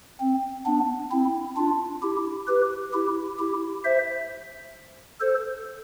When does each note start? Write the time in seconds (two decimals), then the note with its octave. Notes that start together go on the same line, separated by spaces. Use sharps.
0.20 C4
0.66 B3 D4
1.11 C4 E4
1.57 D4 F4
2.02 E4 G4
2.47 G4 B4
2.93 E4 G4
3.39 E4 G4
3.84 C5 E5
5.20 A4 C5